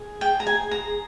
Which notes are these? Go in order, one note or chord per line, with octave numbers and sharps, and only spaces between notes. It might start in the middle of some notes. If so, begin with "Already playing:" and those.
Already playing: G#4
G5
A#5
G#5
A#5